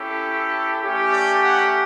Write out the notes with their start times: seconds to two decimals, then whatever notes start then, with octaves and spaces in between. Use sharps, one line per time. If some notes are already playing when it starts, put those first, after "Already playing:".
Already playing: C#4 E4 G4 A4
0.82 A3 C#4 G4
1.12 D5
1.42 F#5